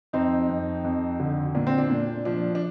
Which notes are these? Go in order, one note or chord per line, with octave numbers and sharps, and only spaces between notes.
F2 C4 D#4
F2
F2
D3
A#2 D4
C4
D4
A#2
F3 D4
D4